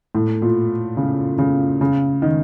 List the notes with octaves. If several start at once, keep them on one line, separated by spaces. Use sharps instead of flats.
A2
A#2
C#3
C#3
C#3
D#3